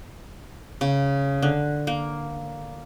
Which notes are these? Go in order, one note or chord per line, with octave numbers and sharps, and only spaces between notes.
C#3
D3
A#3